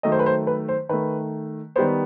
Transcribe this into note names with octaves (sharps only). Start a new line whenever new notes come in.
D#3 F#3 A3 D#5
C5
B4
C5
B4
C5
D#3 A3 B4
D#3 G3 B3 C5